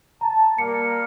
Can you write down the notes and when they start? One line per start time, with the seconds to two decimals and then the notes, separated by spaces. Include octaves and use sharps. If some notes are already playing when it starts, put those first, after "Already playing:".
0.21 A5 A#5
0.58 G3 A#3 C#7